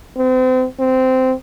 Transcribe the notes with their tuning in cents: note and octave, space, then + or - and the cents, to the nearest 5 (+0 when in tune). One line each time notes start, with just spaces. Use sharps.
C4 -35
C4 -15